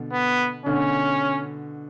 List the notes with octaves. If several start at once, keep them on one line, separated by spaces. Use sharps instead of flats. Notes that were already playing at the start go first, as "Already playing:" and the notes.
Already playing: B2 D3
B3
B2 D3 C#4